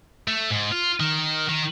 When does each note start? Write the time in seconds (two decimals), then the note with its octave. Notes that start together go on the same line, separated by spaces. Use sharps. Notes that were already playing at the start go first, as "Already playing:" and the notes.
0.28 A3
0.50 G#2
0.72 F4
1.00 D#3
1.49 D#3